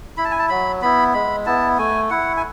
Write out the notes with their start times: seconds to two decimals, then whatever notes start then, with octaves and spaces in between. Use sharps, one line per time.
0.17 E4 B5
0.25 A5
0.31 G#5
0.39 A5
0.49 F#3 B5
0.82 B3 E4 B5
1.14 G#3 B5
1.46 B3 E4 A5
1.78 A3 G#5
2.10 E4 F#5
2.37 G#5